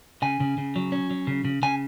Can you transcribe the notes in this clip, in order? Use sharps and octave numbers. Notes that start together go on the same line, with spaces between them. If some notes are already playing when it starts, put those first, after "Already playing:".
C#3 G#5
C#3
C#3
F#3
C#4
F#3
C#3
C#3
C#3 G#5